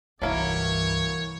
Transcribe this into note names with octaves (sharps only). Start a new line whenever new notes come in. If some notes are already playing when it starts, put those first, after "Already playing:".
C2 G2 E3 F#3 A#3 E4 C#5